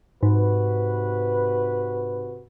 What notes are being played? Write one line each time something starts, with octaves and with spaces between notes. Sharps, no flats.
G#2 C3 F#4 B4